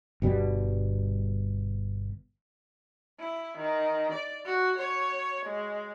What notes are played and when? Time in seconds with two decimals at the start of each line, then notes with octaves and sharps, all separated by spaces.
0.22 G1 B2 G3
3.19 E4
3.58 D#3
4.12 D5
4.45 F#4
4.78 C#5
5.45 G#3